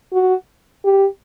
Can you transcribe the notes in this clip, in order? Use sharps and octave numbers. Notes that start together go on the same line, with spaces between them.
F#4
G4